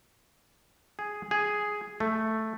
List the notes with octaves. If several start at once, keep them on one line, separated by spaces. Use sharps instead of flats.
G#4
G#4
A3